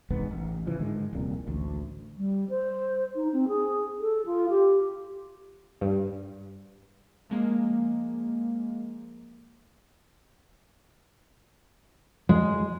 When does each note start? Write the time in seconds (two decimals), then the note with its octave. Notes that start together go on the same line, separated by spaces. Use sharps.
0.10 F1 E2 G#2 B3
0.31 A1
0.67 C#3 E3 F3
0.80 G#2 D3 D#3 G#3
1.13 D#1 C2 F2 A#2
1.47 A1 D2
2.17 G3
2.49 C5
3.15 D#4
3.33 C4
3.48 G#4
4.00 A4
4.26 F4
4.49 G4
5.81 G2
7.30 F3 G#3 A#3
12.29 G#3